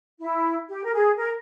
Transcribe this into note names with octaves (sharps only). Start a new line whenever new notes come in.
E4
G4
A#4
G#4
A#4